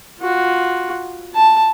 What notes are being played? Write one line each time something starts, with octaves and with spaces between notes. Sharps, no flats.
F4 F#4
A5